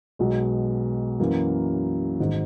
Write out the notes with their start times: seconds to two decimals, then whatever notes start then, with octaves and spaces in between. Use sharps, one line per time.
0.19 B1 B2 G#3
1.20 F#2 E3 A#3
2.20 G#1 G#2 F#3